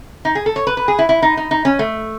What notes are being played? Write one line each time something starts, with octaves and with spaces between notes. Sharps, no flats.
D#4
G#4
A4
C#5
B4
B4
G#4
E4
E4
D#4
D#4
D#4
C#4
A3